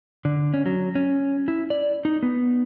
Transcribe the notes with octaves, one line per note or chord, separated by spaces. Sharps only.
D3
C#4
F#3
C#4
E4
D5
D#4
B3